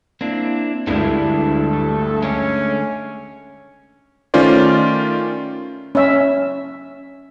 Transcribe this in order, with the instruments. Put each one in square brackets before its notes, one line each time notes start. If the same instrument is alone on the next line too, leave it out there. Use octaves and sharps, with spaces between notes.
[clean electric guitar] A#3 [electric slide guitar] C4 D4 E4
[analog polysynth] D2 G2 [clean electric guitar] G3 G#3 F4 [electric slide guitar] D4 E4 [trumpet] A4
[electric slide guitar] A3
[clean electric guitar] D3 G#3 [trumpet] C#4
[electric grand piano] D#3 A3 C#4 F4 C5 D5
[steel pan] C#4 E5